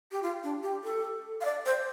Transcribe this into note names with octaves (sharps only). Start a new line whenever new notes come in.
G4
F4
D4
G4
A4
F5
D5
C5